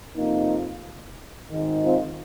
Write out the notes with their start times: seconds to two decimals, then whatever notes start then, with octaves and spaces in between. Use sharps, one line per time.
0.16 F2 C3 F3 A#3 D#4
1.51 G#1 G#2 D#3
1.85 C4 F4